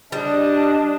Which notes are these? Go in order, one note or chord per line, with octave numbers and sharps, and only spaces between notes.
G3 D4 D#5